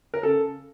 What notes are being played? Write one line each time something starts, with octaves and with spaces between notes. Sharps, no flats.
A#4
C#3 A4